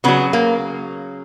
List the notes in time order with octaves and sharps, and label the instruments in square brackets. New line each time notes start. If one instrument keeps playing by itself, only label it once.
[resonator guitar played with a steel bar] C#3 F#3 B3
A#3